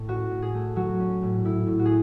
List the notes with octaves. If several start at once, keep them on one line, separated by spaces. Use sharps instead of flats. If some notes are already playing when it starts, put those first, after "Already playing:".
Already playing: A2 A3
C#4 F#4
A2
G#4
A3
F#3 F#4
C#4
A2
A2 E4
A2
F#4
G#4